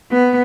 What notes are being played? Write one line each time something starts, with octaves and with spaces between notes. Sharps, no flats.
B3